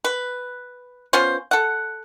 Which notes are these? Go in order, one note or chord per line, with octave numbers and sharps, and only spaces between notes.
B4
B3 C#4 F4 C5
A4 F#5